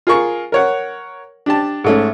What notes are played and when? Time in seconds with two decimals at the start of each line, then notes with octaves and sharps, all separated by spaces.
0.07 F4 G#4 A#4 C#6
0.52 A#4 C#5 F#5
1.46 D4 G4 A5
1.84 G#2 A3 C#4